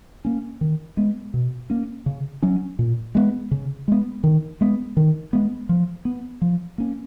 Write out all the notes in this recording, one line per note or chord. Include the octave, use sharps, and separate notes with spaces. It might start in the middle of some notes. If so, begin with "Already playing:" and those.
A#3 C#4
D#3
G#3 B3
B2
A#3 C#4
C#3
F#3 C#4
A#2
G#3 B3
C#3
G#3 B3
D#3
G#3 B3
D#3
G#3 B3
F3
B3
F3
A#3 C#4